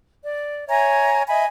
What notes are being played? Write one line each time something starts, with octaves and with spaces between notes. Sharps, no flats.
D5
C#5 E5 G#5 A#5
D#5 E5 G#5 B5